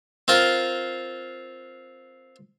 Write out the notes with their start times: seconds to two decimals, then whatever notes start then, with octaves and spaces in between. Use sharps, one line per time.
0.28 C4 F4 A#4